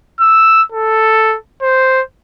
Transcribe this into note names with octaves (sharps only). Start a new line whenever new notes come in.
E6
A4
C5